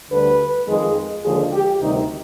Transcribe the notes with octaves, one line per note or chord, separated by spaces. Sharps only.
D2 D3 G3 B4
F2 D#3 G#3
D#2 D3 F3 G#3 G#4
G4
D2 C3 D#3 G3 D#4